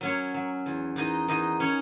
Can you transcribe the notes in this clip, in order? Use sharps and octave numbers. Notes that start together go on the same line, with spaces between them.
F#3 C#4 C#5
F#3
E2
E2 D#4 D#5
E2 D#4 D#5
C#4 C#5